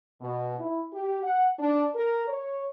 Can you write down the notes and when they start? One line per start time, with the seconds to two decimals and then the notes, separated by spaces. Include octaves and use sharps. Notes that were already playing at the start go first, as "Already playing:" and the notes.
0.21 B2
0.58 E4
0.93 G4
1.23 F#5
1.58 D4
1.95 A#4
2.28 C#5